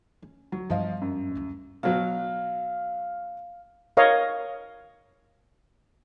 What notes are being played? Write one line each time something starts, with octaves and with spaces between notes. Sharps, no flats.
C#4
D2 F#3
G2 F3 B3 D#5 F5
F#2
D2 E4
B2 F#3 F5
A#4 C#5 D#5 F5